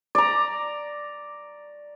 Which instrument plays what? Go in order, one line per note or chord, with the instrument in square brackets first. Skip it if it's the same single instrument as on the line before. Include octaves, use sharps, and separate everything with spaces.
[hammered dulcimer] D5 A#5